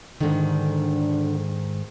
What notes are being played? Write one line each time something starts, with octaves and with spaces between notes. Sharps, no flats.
G#2 D3 D#3